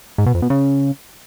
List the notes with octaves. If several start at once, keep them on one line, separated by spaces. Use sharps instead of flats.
G#2
B2
F2
B2
C#3